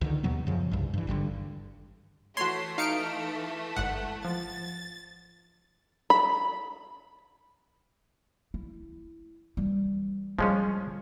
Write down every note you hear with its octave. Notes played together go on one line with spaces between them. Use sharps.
C#2 D3 D#3
D#2 B2 F#3 B3
F#2 C#3 F3
C2 G2
G2 E3
G#1 G2 B2 D3
E3 A3 F#4 C#5 C6
D#4 F5 F6 C#7 D7
G1 G#2 F#5
F3 A6
B5
E4
E3 G3
F3 G3 G#3 C#4